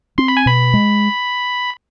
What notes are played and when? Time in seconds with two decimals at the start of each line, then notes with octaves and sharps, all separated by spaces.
0.18 C4 C6
0.28 B5
0.37 G#5
0.46 B2 B5
0.74 G#3